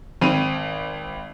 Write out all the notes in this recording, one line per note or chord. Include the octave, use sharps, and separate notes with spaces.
G#1 C4 B5 D#7 F7